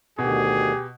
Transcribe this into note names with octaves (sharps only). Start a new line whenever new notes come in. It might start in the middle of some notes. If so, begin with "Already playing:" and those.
D2 B2 D3 D#3 G4 G#4